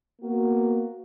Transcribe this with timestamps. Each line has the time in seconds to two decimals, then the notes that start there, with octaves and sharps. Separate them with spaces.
0.22 A#3 B3 F#4